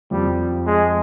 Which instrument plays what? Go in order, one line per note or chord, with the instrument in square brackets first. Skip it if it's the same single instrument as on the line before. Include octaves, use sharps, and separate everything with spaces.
[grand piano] F2 F3 [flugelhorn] G3
[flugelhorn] G#3